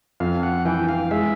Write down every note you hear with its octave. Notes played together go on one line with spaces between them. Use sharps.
F2 F5
F#5
E3 G5
F5
G#3 E5